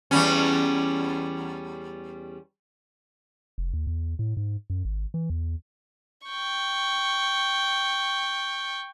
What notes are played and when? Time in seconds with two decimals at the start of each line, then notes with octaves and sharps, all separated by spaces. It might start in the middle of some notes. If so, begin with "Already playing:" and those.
0.11 E2 G3 C#4
3.58 F1
3.74 D#2
3.87 E2
4.19 A2
4.37 G#2
4.70 F#2
4.85 G#1
5.14 E3
5.30 E2
6.27 G5 C#6